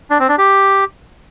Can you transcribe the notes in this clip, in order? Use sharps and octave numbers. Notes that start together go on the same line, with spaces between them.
D4
C4
D4
G4